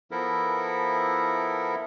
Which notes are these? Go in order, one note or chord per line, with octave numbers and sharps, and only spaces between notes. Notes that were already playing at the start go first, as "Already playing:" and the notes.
F3 B3 E4 A4 A#4 E5